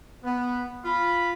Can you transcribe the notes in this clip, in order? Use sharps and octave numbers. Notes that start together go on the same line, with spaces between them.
B3
F4 B5